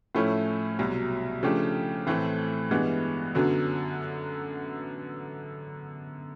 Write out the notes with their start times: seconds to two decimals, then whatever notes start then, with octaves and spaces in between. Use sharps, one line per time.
0.15 A2 F3 A3 C#4 E4
0.79 C2 B2 F#3
1.43 C#3 F3 A3 D4 G4
2.07 A2 E3 A3 C4
2.71 G2 E3 G#3 B3
3.35 F#2 D3 F#3 B3